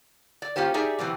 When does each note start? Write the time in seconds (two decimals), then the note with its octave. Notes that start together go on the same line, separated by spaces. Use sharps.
0.42 D5
0.56 A#3 C#4 F4 G4 C5
0.74 D#4 G4 G#4 D5 E5
0.99 B2 E3 G3 C4